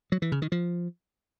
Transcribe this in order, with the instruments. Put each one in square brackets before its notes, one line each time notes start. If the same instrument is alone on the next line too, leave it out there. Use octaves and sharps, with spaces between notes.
[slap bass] F#3
E3
C#3
D#3
F3